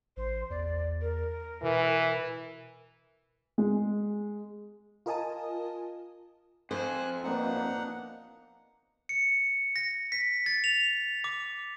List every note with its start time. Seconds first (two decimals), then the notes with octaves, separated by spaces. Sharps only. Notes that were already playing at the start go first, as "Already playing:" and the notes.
0.17 A1 C5
0.50 E2 D5
1.01 A#4
1.63 B2 E3
3.58 G#3
5.06 F4 A#4 D#5 G#5 A5 D#6
6.71 F2 C5 G#5 F#6
7.24 A#3 B3 D4 D#4 F#5
9.09 C#7
9.76 A#6
10.12 B6
10.46 A6
10.64 F7
11.24 D6